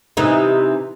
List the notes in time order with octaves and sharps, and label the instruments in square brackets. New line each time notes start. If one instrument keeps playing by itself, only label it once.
[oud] C3 E3 D#4